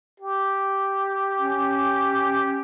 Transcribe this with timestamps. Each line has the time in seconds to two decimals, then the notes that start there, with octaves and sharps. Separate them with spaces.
0.20 G4
1.39 C#4